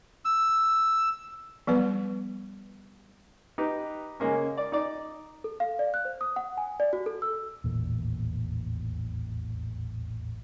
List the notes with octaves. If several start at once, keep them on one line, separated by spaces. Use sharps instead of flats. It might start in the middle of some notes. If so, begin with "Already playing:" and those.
E6
F3 G3 B3 B4
D#4 G4 B4
C#3 G#3 A#3 C#4
D5
D#4 D5
A4
F5
D5
F#6
C5
D#6
F#5
G#5
D5
F#4
A4
E6
D#1 A1 E2 A#2